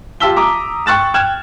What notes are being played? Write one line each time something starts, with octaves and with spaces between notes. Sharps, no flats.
F4 G4 A5 E6 B6 G7
A#5 D6 D#6
G5 C#6 F#6 A6 E7
G5 F6 F#6 G#6 E7